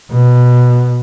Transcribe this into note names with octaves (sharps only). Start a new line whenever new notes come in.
B2